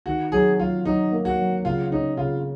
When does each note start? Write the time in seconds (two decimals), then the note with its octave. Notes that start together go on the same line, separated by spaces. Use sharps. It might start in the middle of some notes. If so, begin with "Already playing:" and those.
0.06 D#3 F#4
0.32 F#3 G#4
0.59 F#3 F4
0.85 F#3 D#4
1.12 A#3
1.25 F#4
1.39 F#3
1.65 C#3 F4
1.91 C#4 D#4
2.17 C#3 F4